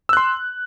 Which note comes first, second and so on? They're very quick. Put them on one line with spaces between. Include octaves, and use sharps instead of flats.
E6 F#6 C6